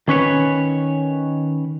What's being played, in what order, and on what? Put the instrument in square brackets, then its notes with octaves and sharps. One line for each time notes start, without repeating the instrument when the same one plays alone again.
[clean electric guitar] D#3 C#4 B4 C#5